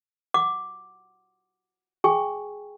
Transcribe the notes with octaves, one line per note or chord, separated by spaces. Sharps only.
F#5 D6
G#4 G5 G#5 C#6